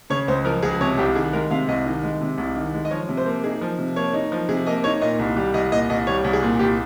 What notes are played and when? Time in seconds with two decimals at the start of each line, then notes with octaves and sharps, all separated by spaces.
0.10 C#3 C#5
0.28 C#2 C5
0.45 F3 A#4
0.63 C#2 G#4
0.81 C3 C#5
0.97 C2 G4
1.15 D#3 G#4
1.33 G#3 A#4
1.51 C3 F5
1.68 C2 D#5
1.86 D#3
2.03 G#3
2.21 C3
2.38 C2
2.56 D#3
2.74 G#3
2.85 D#5
2.91 F3 C#5
3.09 C3
3.17 C5
3.26 A#3
3.43 D#4 G#4
3.61 F3
3.79 C3
3.96 A#3 C#5
4.13 D#4
4.32 F3
4.49 C3 G#4
4.66 A#3 D#5
4.84 D#4 C#5
5.01 A#2 D#5
5.19 C2
5.36 G3
5.54 C2 D#5
5.72 A#2 D#5
5.90 C2 D#5
6.07 G3 C#5
6.24 C2
6.33 G#4
6.42 A#2
6.59 C2 G4